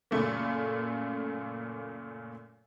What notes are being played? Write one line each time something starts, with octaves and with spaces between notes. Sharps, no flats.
F#2 A#2 C#3 A3 A#3